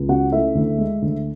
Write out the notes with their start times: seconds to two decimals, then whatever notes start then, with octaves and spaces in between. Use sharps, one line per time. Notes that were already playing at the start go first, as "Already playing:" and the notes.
Already playing: C#2
0.09 C#3 F#4 F#5
0.32 A3 E4 E5
0.55 D2
0.78 G#3
1.02 D2